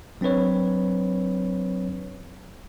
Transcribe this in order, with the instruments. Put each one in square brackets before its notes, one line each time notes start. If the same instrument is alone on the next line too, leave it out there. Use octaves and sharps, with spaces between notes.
[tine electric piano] F#3 C4 D4 B4 C#5